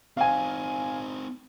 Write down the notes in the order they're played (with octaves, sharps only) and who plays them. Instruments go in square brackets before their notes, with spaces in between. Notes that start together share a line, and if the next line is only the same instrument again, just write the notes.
[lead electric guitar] C4 D#4 [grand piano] F5 G#5